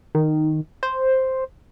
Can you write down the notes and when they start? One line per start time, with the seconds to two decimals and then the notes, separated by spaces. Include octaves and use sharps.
0.15 D#3
0.83 C5